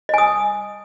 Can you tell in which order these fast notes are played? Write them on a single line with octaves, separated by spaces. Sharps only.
D#5 G#5 D#6